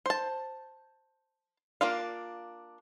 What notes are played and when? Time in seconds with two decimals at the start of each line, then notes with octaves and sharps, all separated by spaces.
0.06 C5 A5
1.81 A#3 D4 F4 F5